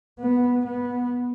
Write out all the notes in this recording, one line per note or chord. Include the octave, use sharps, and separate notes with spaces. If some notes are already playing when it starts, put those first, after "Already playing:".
B3
B3